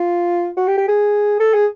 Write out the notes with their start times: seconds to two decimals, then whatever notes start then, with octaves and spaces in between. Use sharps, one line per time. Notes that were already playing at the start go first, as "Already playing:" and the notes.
Already playing: F4
0.57 F#4
0.68 G4
0.78 G4
0.88 G#4
1.40 A4
1.54 G#4